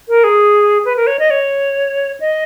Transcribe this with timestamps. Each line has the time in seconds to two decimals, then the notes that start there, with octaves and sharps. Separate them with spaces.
0.09 A#4
0.24 G#4
0.85 B4
0.97 A#4
1.07 C#5
1.19 D#5
1.30 C#5
2.20 D#5